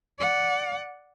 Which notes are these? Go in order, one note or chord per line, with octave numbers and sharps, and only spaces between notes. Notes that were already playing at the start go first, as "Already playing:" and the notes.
D5 F#5